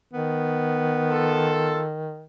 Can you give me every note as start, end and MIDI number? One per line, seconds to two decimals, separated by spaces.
0.13 2.24 51
0.13 1.79 59
1.09 1.82 65
1.09 1.82 69